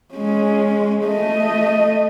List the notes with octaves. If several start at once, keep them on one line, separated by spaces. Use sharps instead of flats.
G#3 C#4
A3 D#5